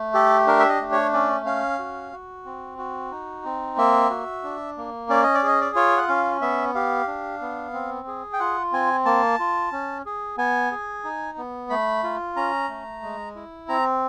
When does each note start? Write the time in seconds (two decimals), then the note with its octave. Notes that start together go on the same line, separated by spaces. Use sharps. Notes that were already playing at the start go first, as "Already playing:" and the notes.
Already playing: A3
0.14 G4 A4
0.47 D4 A#4
0.59 E5
0.69 D#5
0.81 A3
0.92 C#5
1.13 C#4 D5
1.46 C#4 F5
1.79 F#4
2.12 F#4
2.45 C4
2.78 F#4
3.11 D#4
3.45 C4
3.77 A#3 E5
4.10 F#4
4.44 D4
4.77 A#3
5.09 C#4 D5
5.23 D#5
5.34 D5
5.43 G#4 D#5
5.61 D5
5.75 F4 C#5
5.97 F#5
6.08 C#4 F5
6.42 B3 E5
6.75 G4 F5
7.07 D4
7.41 B3
7.73 C4
8.07 G#4
8.33 G5
8.39 F4 F#5
8.72 C4 G#5
9.05 A#3 A5
9.39 F4
9.72 C#4
10.06 G#4
10.38 B3 G#5
10.72 G#4
11.04 D#4
11.38 B3
11.70 A3 B5
12.03 F4
12.36 C#4 A#5
12.69 A3
13.03 G#3
13.36 E4
13.69 C4 A#5